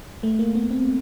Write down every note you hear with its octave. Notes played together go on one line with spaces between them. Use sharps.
A3
A#3
B3
C4